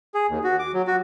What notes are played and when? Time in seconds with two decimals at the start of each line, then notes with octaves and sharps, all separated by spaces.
0.14 G#4
0.29 D#2
0.44 F#4
0.59 D6
0.74 F#3
0.87 F#4